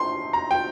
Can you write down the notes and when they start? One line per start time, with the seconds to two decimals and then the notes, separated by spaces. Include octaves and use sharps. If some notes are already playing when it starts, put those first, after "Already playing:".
Already playing: C6
0.33 A#5
0.51 G5